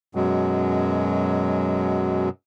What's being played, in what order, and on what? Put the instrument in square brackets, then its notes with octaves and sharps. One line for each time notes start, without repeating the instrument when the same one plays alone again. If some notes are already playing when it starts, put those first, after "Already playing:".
[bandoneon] F#2 B2 F#3 G#3